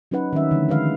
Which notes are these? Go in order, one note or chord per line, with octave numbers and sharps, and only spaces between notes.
F#3 C#4 D#4 B4 F#5
D#3 G3 C4 C#4 E5
D3 E3 F3 A3
D#3 G#3 B4 F5